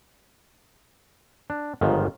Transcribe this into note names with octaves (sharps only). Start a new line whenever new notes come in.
D4
G1 G#2 D#3 F3